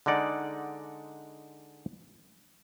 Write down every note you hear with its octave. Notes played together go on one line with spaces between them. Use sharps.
D3 G#3 D#4 D5 F#5